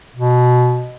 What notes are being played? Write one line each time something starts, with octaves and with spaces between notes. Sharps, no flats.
B2